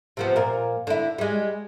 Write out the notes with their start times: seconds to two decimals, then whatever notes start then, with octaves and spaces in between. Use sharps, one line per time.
0.17 C3 F3 B3
0.36 A#2 A#4
0.87 D3 E4
1.18 G3 G#3